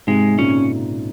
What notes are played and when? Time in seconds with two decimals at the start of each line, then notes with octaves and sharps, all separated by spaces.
0.07 G#2 C3 G#3
0.34 C3
0.38 A#2 C#3 C#4